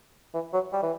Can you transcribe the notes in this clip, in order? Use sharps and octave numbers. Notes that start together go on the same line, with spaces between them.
E3
F#3
G3
E3